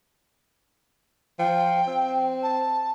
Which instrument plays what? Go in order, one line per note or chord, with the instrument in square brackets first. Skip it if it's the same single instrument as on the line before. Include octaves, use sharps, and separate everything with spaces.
[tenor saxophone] F3 [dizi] G5
[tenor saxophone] C4
[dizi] A5